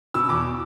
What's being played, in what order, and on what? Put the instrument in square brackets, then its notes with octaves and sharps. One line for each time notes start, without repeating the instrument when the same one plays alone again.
[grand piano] B2 E6
E2 D6